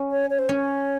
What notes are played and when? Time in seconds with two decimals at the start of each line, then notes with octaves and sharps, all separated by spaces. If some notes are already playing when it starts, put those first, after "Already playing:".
Already playing: C#4
0.11 C#5
0.30 C#5
0.39 C5
0.49 C#4 C#5